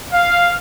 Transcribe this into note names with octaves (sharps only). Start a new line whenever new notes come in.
F5